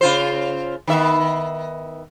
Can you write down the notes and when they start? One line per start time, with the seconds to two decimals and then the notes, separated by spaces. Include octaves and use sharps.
0.01 C#3 F4 C5
0.87 D#3 B3 E5